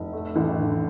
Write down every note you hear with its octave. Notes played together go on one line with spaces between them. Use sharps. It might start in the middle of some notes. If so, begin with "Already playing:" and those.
Already playing: F1
A3
A1
D3